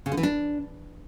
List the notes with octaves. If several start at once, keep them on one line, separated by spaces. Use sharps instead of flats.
C#3
D3
E3
D4